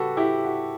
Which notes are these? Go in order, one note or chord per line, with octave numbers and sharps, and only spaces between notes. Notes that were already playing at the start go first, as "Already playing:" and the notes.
Already playing: C#3 G3 F#4 G4 A4 B4
E4 G4
F#4